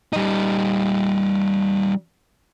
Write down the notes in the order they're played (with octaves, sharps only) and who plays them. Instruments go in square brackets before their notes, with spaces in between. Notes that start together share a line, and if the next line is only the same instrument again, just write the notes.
[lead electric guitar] G3 D#4